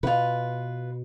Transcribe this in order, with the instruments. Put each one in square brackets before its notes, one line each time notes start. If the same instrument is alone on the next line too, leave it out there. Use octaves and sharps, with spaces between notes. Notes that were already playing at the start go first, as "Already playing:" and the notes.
[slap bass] B2 [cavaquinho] F4 B4